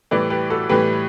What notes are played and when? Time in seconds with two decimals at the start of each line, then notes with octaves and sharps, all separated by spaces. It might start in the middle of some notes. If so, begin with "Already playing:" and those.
0.11 A2 E3 G3 B4 D5
0.30 G4 B4
0.50 F#4 A4
0.69 A2 E3 G3 G4 B4